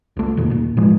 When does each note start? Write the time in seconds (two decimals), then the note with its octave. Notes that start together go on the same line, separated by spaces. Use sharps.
0.17 C2 A3
0.37 E2 A#2 D#3
0.50 D#1 A#2
0.77 A2 D#3 F3 G#3